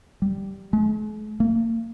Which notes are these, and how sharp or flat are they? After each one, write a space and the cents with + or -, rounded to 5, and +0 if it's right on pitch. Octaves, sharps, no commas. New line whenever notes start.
G3 -5
G#3 +45
A#3 -35